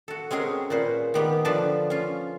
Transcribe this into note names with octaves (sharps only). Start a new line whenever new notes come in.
F#4 A4
G#3 C4 C#4 G#4 A#4
A#2 C#4 B4 C5
D#3 B3 G4
D3 F3 B4 D5 A5
C#4 F4